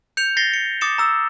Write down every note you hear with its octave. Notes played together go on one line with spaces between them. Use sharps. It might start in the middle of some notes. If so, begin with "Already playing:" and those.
G6 C#7 F7
A6 A#6 C7 C#7 G7
C#7
D6 D#6 A6 C#7 E7
A#5 E6